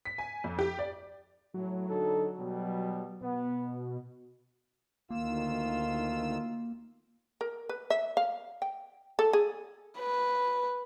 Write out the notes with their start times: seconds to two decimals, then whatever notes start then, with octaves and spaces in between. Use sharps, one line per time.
0.05 B6
0.18 G#5
0.44 F2
0.59 G4
0.79 D5
1.54 A2 F#3
1.88 D3 D#4 A4
2.39 B2 G3
3.22 B2 B3
5.11 D2 D#3 A#3 F4 E6
7.41 A#4
7.69 B4
7.90 E5
8.17 F5
8.62 G5
9.19 A4
9.33 G#4
9.99 B4